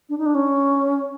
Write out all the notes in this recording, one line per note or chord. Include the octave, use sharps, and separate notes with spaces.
D4
D#4
D4
C#4